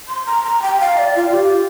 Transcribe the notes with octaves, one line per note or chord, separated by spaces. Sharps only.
C6
A#5
A#5
G5
F5
D5
F4
G4